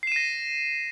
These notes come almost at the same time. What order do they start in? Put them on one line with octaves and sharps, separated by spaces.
C7 E7 D#7 A#6